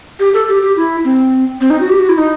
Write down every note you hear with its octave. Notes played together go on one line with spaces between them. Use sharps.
G4
A4
G4
G4
E4
C4
C4
D#4
F#4
G4
F#4
E4
D#4